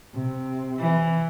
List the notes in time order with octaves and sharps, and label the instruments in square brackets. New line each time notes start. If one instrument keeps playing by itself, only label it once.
[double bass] C3
[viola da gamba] E3